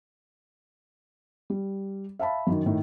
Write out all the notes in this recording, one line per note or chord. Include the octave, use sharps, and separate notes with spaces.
G3
E5 F5 A5 B5
F#2 D#3
A2 D#3